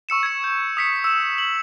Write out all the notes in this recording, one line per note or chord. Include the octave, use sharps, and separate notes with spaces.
C#6 E6 C#7 E7
G#6 C#7
G6
D#6 B6 C#7
E6 E7
F#7